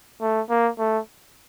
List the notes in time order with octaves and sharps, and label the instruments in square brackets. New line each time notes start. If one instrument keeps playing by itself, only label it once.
[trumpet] A3
A#3
A3